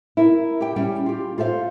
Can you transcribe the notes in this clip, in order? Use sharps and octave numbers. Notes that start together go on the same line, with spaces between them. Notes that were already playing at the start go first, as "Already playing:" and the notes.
E4 A#4
G4 G5
G3 C#4 G5
F4 G4
F4 A4 C5 E5 F5